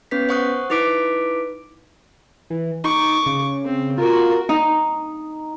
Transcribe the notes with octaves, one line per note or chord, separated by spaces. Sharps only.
B3 C#4 B4 B6
C5 F#5 C#6 D#6 F#6
D#4 E4 B4 D6 B6 D7
E3
D#4 C#6 D6
C#3
C4
F4 F#4 A#4
D#4